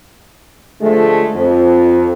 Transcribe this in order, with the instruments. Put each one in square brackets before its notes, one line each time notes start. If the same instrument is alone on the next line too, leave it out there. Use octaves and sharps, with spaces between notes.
[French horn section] D3 F3 G#3 A3
F2